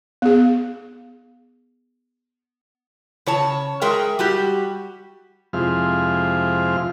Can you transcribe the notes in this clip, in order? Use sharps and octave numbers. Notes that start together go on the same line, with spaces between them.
B3 G#4
C#3 C#5 A5
G#3 G#4 A#4 E5 G5
G3 F#4 G4
F2 C3 F3 G#3 E4 F6